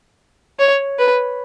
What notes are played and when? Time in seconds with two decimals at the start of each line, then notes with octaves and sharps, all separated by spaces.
0.59 C#5
0.99 B4